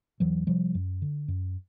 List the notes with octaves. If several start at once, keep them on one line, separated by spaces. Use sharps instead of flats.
E2 E3 F#3
C3 F3 G3
F#2
D3
F#2